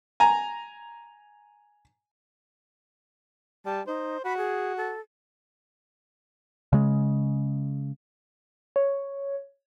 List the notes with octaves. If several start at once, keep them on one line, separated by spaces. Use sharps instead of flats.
G#5 A#5
G3 A5
D#4 C5
F#4 B5
G#4
A4
C#3 G#3
C#5